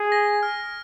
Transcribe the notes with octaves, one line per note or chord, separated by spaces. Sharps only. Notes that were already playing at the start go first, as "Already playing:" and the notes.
Already playing: G#4
A#6
F6